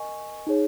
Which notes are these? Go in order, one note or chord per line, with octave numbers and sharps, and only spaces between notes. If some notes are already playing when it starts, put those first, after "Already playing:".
Already playing: A#4 D#5 G#5 C#6
D#4 G#4 C#5